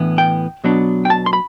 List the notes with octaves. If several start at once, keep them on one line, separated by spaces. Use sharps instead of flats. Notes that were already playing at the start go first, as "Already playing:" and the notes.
Already playing: A2 E3 B3 D4
G5
B2 F#3 B3 D4
G5
A5
C6
B5